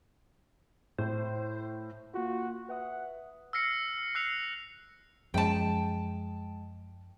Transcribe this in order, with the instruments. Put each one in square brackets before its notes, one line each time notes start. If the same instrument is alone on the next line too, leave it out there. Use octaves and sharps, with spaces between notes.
[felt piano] A2 [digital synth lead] C5
[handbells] A#3 F4 [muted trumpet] F#4
[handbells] B4 E5 D#6 [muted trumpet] F#5
[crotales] E6 F6 A#6 C7 C#7
E6 F#6 C7 C#7 F7
[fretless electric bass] F#2 F3 [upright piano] G#3 [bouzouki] G5 A5